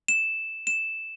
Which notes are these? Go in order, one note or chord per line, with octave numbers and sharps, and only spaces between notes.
E7
E7